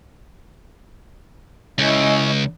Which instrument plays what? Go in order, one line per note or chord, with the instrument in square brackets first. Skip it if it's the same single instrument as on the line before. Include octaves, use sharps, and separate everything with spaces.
[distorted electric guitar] C#2 [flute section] C#4 E4 D#5